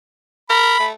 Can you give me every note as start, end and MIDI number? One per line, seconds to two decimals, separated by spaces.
0.50 0.76 70
0.50 0.86 83
0.80 0.92 57